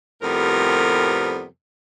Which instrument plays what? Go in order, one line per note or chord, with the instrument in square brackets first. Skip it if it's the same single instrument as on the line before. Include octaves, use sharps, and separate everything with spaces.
[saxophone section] F2 A2 C3 G3 B3 A#4